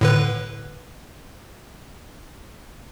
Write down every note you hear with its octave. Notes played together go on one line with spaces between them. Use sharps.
A2 D3 B4